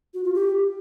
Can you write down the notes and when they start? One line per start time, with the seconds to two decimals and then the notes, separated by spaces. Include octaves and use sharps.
0.14 F#4
0.24 F4
0.34 G4